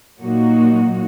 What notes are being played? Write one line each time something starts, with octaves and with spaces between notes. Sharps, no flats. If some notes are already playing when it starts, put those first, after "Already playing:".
A#2 F#3 A#3 D#4 F#4